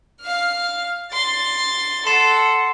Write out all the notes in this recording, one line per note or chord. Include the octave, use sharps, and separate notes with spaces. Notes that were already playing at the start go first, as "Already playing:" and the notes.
F5 F6
C6 A6
A4 F#5 C6 C7 E7